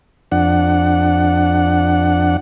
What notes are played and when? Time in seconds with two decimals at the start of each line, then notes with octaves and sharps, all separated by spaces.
0.32 F2 D4 F#5